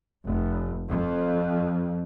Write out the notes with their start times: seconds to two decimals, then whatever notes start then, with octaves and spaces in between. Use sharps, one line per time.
0.24 F1
0.90 F2